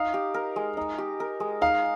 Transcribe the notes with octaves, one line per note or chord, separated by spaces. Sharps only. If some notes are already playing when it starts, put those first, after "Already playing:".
Already playing: D#4 F5
G4
A#4
G#3
D#4
G4
A#4
G#3
D#4 F5